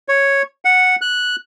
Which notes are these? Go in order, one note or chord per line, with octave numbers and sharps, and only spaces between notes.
C#5
F#5
F#6